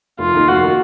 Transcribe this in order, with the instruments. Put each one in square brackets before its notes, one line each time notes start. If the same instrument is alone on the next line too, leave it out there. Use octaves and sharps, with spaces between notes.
[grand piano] F1 [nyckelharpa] F4
[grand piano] D#2 D#3 A#3 D#4
[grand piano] F1 [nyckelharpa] F#4
[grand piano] D#3 A#3 D#4